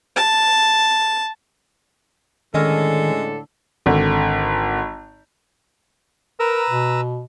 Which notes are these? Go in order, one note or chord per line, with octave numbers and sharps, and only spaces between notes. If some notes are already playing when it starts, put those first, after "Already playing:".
A5
A2 D3 D#3 G#3 C#4 A4 D#5
G#1 D3
A#4 B4 A#5 E6
B2